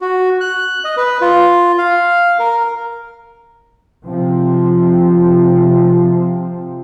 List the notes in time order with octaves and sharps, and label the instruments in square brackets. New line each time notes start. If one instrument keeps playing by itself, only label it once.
[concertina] F#4
F#6
D#5
B4
F4
F5
A#4
[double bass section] C3 F3 C4